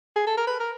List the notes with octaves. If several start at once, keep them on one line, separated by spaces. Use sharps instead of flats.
G#4
A4
A#4
B4
A#4